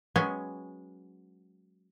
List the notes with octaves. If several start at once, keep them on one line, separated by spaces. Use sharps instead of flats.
F#3 G#3 B3 C#4 G5 G#5